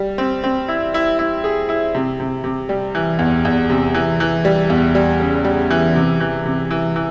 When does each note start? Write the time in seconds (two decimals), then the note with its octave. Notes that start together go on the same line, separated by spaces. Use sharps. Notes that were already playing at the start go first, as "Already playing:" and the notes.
Already playing: G3
0.18 C4
0.44 C4
0.68 E4
0.94 E4
1.19 E4
1.44 G#4
1.69 E4
1.95 C3
2.20 C3
2.44 C3
2.69 G3
2.95 E3
3.19 E2
3.45 E2
3.70 C3
3.94 E3
4.20 E3
4.45 G3
4.70 E2
4.95 G3
5.19 C#3
5.44 G3
5.70 E3
5.95 C3
6.20 E3
6.46 C3
6.71 E3
6.96 E3